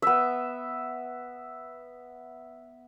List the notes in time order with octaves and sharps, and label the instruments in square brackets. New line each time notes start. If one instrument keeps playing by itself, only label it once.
[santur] B3 E5